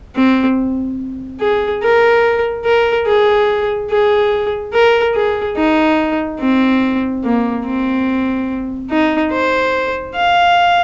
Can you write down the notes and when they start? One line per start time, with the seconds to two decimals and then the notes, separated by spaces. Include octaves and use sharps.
0.15 C4
1.41 G#4
1.83 A#4
2.65 A#4
3.07 G#4
3.90 G#4
4.73 A#4
5.15 G#4
5.56 D#4
6.39 C4
7.24 A#3
7.65 C4
8.90 D#4
9.32 C5
10.15 F5